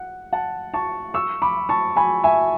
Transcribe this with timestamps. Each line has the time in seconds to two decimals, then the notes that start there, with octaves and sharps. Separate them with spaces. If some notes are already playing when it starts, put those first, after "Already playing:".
Already playing: F#5
0.33 F#5 A5
0.74 A5 C#6
1.14 C#6 E6
1.42 B5 D6
1.69 A5 C#6
1.96 G#5 B5
2.24 E5 G#5